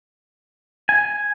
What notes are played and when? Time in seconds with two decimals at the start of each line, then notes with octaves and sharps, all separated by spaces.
0.89 G#5